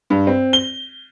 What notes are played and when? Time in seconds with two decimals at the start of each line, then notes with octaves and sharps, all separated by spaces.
0.10 G2
0.27 C4
0.53 G7